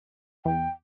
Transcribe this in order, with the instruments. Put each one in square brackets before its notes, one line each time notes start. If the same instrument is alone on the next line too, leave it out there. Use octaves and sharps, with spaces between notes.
[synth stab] E2 [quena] G5